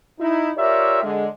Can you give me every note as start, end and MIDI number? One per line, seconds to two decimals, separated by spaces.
0.20 0.51 63
0.20 0.51 64
0.58 1.01 65
0.58 1.01 67
0.58 1.01 70
0.58 1.01 73
0.58 1.01 74
0.58 1.01 76
1.03 1.27 50
1.03 1.27 56